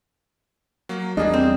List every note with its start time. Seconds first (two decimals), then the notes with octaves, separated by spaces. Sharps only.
0.89 F#3 A#3
1.17 E2 G3 A#3 D4 G#4 D#5
1.34 C4